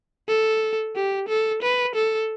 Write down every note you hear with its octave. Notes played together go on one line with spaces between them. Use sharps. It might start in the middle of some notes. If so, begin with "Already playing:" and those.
A4
G4
A4
B4
A4